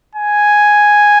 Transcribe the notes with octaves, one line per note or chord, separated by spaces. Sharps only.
G#5